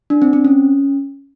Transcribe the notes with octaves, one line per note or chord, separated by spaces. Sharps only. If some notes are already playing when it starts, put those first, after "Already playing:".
D4
C4
C4
C#4